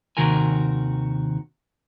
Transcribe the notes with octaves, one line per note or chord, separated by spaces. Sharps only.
D#2 C3 D#3 F#4 A#4 G#5